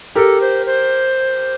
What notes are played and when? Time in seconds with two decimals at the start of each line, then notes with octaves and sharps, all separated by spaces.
0.15 G4 A4 A#4
0.41 C5
0.66 C5